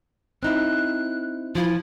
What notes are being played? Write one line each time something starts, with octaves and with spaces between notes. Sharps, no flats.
C4 D#4 E4 F#6
F3 E4 F4